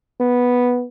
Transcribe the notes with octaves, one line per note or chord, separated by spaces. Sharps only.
B3